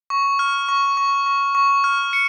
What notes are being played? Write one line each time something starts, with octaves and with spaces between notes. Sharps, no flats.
C#6
F6
C#6
C#6
C#6
C#6
F6
C#7